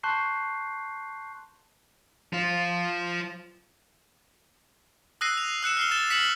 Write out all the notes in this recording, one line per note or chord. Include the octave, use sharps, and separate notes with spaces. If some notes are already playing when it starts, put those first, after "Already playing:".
A5 C6 C#6 F#6 G6 C7
F3 F4
D#6 E6 F#6 A#6 C7 D#7
F7
E6 F#6 C#7 E7
F6 C7 G7
A6 E7 G7
B6 C#7 E7 F#7